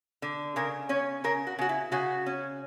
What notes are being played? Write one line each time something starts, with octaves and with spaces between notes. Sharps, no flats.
D3
C#3 A#4
C#4 C#5
C#3 A#4
F#4
C#3 F#4
E4
C#3 F#4
C#4